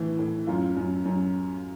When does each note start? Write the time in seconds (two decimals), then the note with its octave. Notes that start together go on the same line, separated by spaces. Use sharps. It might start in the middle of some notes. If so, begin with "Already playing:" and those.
Already playing: A2 E3
0.19 A2
0.47 F#2 F4
0.77 F#2
1.05 F#2